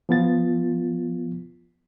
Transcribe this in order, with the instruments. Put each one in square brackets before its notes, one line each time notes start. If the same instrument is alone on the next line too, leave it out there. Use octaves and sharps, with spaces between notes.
[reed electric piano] F3 B3 F4 A6